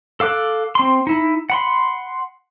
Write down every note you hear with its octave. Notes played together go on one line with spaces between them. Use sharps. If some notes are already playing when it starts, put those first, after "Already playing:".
A4 F5 D6 F#6
C4 C6
D#4 E4
F#5 B5 C6